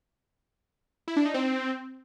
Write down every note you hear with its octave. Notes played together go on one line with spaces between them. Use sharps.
E4
D4
D#4
C4